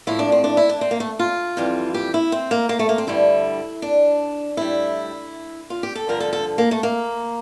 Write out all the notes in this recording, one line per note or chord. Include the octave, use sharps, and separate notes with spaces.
A2 F3 E4
D4
C4
D4
E4
D4
C4
A#3
A3
F4
F2 E3 G3
G4
E4
C4
A#3
A#3
A3
A#3
C4
G2 D3 G3 E4
D4
A2 G3 E4
F4
G4
A4
G2 D3 F3 A#4
A4
A4
A#3
A3
A#3